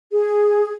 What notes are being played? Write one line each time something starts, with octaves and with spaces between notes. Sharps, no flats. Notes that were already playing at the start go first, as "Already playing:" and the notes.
G#4